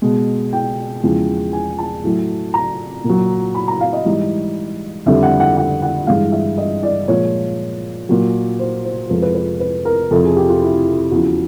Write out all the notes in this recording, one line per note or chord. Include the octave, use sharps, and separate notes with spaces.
B2 G#3
G5
E2 C#3 F3 G#3
G#5
A5
A2 F#3
A#5
A#2
F#3
B5
A#5
F5
D#5
G#2 E3 G3
F2 D3 G3 E5
F#5
F#5
F#5
F#5
G2 E3 G#3 F5
E5
D#5
D5
A#2 F3 G#3 C#5
A#2 F#3
C5
C5
F2 C3 F3 G#3 B4
B4
B4
B4
A#4
F2 C3 F3 A4
G#4
G4
F4
E4
E2 C#3 F3 F#4